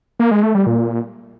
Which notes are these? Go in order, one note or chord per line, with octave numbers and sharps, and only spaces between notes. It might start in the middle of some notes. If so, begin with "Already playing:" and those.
A#3
G#3
A3
G3
A#2